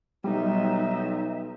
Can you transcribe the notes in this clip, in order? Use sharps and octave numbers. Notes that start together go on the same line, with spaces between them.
B1 G3 D#4 E5